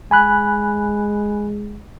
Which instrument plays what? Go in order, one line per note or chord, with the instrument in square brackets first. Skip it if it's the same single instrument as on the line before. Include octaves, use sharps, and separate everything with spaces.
[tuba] G#3 [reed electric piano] G#5 B5 F#6